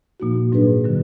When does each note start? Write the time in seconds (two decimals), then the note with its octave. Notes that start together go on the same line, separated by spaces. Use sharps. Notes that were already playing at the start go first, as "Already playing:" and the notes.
0.20 A#2 F3 A#3 D#4 F#4
0.52 G#2 F#3 D4 G#4 B4
0.84 D3 F#3